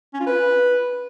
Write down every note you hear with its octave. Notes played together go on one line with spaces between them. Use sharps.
C#4
F4
B4